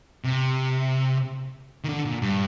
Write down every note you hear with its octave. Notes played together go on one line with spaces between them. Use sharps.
C3
D#3
D3
A#2
G2